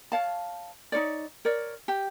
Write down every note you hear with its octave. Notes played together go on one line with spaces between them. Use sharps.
C#5 F5 A5
D#4 F4 C#5 D5
A#4 C#5 D5
G4